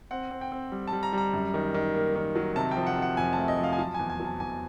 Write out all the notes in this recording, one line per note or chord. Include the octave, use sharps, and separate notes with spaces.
C4 F#5
C4
G5
C4
G3
G3 A5
A#5
G3 A#5
F#2
D#3
D#3
A#3
D#3
F#3
C3 A5
G5
F3
F#5
C3 F#5
F2 G#5
A3 A5
D#5
F3
F5
G#5
F#3 A5
E2 G#5
G#5
F#3
A5
E2 G#5